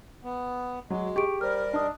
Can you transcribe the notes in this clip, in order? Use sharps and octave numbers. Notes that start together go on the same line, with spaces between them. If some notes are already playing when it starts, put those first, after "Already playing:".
B3
F#3 G#3 F#4
G4 G#4 C#6 D7
G3 A#4 C5 F6
D4 D#5 D#6